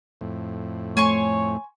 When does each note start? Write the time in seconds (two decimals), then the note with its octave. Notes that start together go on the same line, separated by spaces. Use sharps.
0.21 F2 A2
0.97 A3 C#5 G#5 C6 C#6